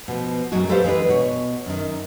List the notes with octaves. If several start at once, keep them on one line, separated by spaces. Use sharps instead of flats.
B2 F3
F#2 A#2 F#3 G#3 F#4
G4 A4 B4 C5 D5 F5
E3 G#3 D4 B4
B2 C#5
F#2 D#3